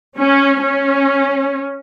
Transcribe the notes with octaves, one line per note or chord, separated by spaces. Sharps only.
C#4
C#4